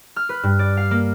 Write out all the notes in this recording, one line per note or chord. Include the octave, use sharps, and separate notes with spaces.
F6
B4
G2
D5
F5
A#3